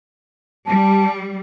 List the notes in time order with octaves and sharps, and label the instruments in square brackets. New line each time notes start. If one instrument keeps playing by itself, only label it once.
[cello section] G3 [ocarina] A5